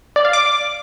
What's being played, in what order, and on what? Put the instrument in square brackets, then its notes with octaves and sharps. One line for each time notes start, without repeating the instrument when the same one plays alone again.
[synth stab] D5
F5
D6